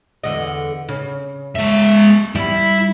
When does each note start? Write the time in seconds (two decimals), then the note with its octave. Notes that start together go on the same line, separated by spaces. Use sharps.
0.23 E2 D3 D#5
0.89 C#3
1.55 G#3 E5
2.35 G3 E4